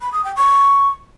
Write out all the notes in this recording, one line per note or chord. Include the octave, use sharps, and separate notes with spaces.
B5
D#6
G5
C#6